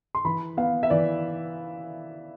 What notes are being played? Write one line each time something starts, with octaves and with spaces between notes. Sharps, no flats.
C6
E3 B5
B3 F5
E5
E3 D5